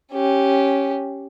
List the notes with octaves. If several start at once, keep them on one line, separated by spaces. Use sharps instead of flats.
C#4 G4